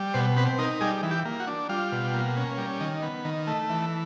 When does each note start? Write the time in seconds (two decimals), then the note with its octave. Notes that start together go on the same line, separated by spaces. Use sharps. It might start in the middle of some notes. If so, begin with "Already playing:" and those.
Already playing: G3
0.14 B2 C5
0.36 C4 B4
0.59 D#4 A#4
0.81 G3 G#4
1.03 E3
1.11 G4
1.25 A#3
1.40 F#4
1.47 D4
1.69 G3 F4
1.92 B2
2.14 A#3
2.37 C#4
2.58 G3
2.81 D#3
3.02 B3
3.25 D#3
3.47 A3
3.69 E3